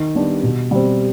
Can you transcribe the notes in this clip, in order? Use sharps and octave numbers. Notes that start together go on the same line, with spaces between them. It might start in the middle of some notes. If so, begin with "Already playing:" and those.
Already playing: D#3
G3 B3 D4 G4
B2
G3 C4